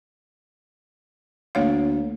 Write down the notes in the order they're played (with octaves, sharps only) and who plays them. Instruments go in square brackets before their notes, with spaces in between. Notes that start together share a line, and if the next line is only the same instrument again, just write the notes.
[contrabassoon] D2 [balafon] A#3 C#5 F5